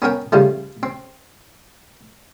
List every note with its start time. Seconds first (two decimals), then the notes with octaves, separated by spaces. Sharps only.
0.02 B3 C#4 A#4 G5
0.32 C#3 F3 G3 A3
0.83 C4